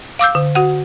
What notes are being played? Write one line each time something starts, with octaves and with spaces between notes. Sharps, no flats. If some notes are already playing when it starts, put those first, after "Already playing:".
F5 D6 E6 G6
D3
F#4 F#5